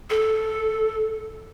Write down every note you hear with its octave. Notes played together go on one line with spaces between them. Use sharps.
A4